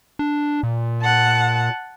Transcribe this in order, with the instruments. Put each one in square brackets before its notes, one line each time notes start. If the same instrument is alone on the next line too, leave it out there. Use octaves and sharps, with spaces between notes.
[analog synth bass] D4
A#2
[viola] F#5 A5